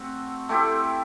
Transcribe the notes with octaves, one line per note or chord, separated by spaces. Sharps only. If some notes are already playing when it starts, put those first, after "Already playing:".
Already playing: A3 C4 F#4
A3 C4 E4 G4